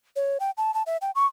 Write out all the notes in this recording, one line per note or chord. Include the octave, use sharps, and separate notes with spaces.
C#5
G5
A5
A5
E5
G5
C#6